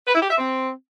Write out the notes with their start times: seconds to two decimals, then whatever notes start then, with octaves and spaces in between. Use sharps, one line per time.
0.07 B4
0.14 E4
0.22 G4
0.30 E5
0.37 C4